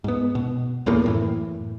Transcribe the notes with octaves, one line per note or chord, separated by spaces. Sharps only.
G#2 B3
B2
D1 E2 A2 A#3
F#2 A2 E3